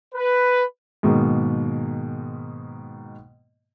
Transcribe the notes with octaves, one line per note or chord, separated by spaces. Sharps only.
B4
G#2 B2 D#3 G#3 A#3